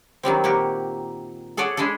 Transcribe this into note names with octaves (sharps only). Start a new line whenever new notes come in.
D#3 F#3 G3 C4
A#2 A#3 F#4 G4
G#4 A4 C#5 D5 F#5
G#3 D4 E4 G#4 A4